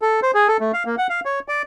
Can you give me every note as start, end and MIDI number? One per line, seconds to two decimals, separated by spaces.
0.02 0.20 69
0.23 0.31 72
0.34 0.48 68
0.48 0.57 69
0.60 0.72 57
0.73 0.83 77
0.86 0.95 58
0.98 1.07 78
1.10 1.20 77
1.25 1.39 73
1.48 1.62 74